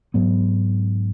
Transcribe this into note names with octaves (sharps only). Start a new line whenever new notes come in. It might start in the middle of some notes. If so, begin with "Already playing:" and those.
G#2 F#3 B3